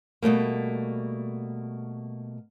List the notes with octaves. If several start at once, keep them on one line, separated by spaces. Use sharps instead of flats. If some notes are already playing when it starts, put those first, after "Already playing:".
B2 G3 A3 A#3